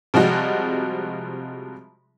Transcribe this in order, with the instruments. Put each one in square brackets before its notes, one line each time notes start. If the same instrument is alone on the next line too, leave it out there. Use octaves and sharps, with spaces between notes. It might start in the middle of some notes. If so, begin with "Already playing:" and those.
[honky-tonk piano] C3 F3 G3 G#3 F#4